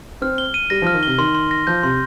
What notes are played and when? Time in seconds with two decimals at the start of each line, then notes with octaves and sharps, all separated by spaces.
0.22 C4 F6
0.38 G7
0.54 D#7
0.70 G3 A#6
0.82 F3 F6
0.94 D#3
1.03 C3 G7
1.18 D#3 C6
1.35 C6
1.51 A#6
1.67 F3 G6
1.83 C3 C6